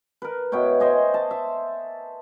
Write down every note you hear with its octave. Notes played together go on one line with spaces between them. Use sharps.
A#4 B4
B2 E4 C#5 G5
C5 D#5 G#5
A5
E5